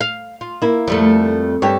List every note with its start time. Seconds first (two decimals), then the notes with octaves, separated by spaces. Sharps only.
0.01 F5
0.41 F4
0.62 A#3 E4
0.88 F2 G3 A3
1.62 G2 G4 A4 C#5